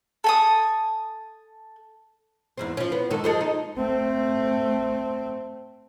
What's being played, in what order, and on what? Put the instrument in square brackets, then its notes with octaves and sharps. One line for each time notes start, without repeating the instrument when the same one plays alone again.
[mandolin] A4 G#5 D#6
[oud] E2 G#2 C4
F3 C#4
B3
G#2 D#3 A4
F3 G#3 A4
D#4
[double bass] A3 C4